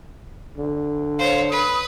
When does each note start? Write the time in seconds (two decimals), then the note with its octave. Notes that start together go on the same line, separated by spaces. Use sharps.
0.58 D3
1.19 C5 C#5 F5
1.50 B4 D#6